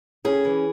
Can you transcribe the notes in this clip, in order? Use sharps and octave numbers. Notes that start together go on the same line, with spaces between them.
C#4 G#4
E3